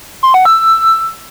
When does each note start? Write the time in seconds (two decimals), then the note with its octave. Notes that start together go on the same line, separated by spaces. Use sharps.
0.23 C6
0.34 F#5
0.45 E6